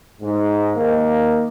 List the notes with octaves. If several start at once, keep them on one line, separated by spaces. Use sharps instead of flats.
G#2
D#3 A#3